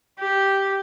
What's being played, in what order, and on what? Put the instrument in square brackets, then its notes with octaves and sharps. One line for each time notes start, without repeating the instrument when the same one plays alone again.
[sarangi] G4